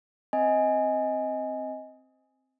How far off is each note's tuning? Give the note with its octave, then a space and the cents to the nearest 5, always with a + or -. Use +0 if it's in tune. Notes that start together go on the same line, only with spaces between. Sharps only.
C4 +0 D#5 +15 G#5 +0